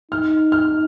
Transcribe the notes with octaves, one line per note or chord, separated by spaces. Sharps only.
D#4 F6
F6